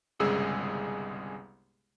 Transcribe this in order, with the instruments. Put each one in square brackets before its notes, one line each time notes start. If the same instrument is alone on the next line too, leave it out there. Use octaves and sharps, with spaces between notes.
[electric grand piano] G1 C2 C#3 G#3 G#4 E6